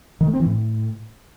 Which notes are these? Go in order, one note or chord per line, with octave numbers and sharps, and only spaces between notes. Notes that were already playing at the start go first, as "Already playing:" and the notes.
D#3
A3
C4
E3
A2